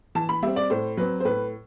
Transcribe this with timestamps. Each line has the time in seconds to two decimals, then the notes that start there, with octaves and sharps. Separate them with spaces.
0.15 E3 A5
0.29 B5
0.42 G3 C4 E5
0.56 D5
0.70 A2 C5
0.97 F#3 C4 B4
1.20 C5
1.25 A2 B4